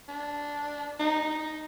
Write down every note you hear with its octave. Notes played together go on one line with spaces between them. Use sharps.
D4
D#4
D#4